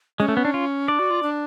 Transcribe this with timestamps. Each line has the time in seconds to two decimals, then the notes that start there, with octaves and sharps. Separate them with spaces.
0.19 G#3 C#4
0.28 A3
0.37 B3
0.45 D4
0.54 F4
0.88 D4 D5
0.99 F#4
1.10 F4
1.23 D4